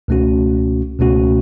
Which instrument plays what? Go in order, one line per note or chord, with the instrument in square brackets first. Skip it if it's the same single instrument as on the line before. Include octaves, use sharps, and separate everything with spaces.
[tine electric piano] C#2 B2 A3 C#4 F#4
C#2 B2 A3 C#4 F#4